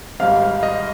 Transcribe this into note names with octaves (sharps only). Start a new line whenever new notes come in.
G#1 G#2 G3 F5
D#5